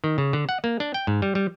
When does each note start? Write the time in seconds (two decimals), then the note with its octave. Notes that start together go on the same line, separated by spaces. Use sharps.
0.04 D#3
0.18 C#3
0.33 D3
0.49 F#5
0.64 A#3
0.80 D4
0.94 G5
1.07 G#2
1.22 G3
1.35 G3